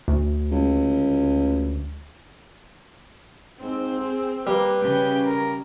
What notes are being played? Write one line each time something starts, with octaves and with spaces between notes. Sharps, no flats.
D2
C#2
G#2 C4
G#4
G3 A#3 B4
C#3 G4
A#4